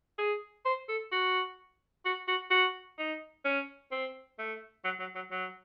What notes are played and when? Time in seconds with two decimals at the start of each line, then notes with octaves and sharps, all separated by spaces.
0.19 G#4
0.66 C5
0.89 A4
1.12 F#4
2.05 F#4
2.28 F#4
2.51 F#4
2.99 D#4
3.45 C#4
3.91 C4
4.39 A3
4.85 F#3
5.00 F#3
5.15 F#3
5.31 F#3